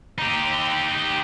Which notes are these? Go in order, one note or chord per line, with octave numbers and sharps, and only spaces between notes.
D#4 G4